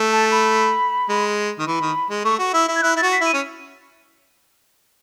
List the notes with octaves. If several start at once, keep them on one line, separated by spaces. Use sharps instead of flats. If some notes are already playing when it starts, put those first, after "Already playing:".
Already playing: A3
A5
B5
G#3
D#3
E3 B5
D#3
G#3
A3 C#6
F#4 C#6
E4 E6
E4
G#6
E4 F#6
E4 A6
F#4
B6
E4 D#7
C#4